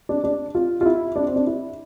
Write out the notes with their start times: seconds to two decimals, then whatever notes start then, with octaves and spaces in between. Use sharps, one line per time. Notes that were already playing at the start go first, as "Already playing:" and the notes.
0.09 D4
0.24 D4
0.55 F4
0.81 F4
0.86 E4
1.16 D4
1.27 C4
1.36 D4
1.47 E4